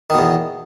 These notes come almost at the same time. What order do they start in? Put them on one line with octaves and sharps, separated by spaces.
D#3 B2 E2